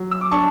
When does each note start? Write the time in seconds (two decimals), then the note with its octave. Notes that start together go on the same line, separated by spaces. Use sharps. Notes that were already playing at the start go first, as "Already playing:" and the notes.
Already playing: F#3
0.11 E6
0.21 D6
0.31 D4 A5 C#6